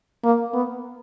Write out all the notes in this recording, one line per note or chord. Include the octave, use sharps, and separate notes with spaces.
A#3
B3